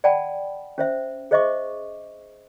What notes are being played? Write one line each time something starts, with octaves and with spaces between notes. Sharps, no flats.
D5 F#5 G5 A5 B5
C#4 C5 E5
G#4 C5 D#5 E5 C#6 D6